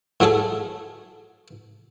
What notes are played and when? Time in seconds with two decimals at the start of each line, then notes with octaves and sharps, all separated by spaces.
0.20 A2 F#3 A3 G#4 A4